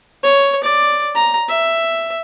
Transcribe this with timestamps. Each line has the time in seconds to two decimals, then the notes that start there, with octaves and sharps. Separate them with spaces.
0.24 C#5
0.63 D5
1.15 A#5
1.49 E5